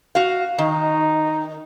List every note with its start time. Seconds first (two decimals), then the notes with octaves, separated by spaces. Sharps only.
0.15 F#4 F5
0.58 D#3 D#4